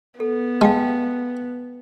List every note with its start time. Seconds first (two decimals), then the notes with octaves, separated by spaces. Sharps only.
0.20 B3 A4
0.61 G#3 F5 G5 A5